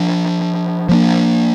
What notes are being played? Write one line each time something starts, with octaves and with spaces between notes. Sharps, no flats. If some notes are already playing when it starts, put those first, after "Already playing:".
Already playing: F3 D4
F3 A#3 D4